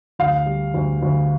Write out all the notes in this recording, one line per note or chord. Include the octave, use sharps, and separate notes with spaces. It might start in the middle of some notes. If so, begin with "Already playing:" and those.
D2 F5
G3
D2
D2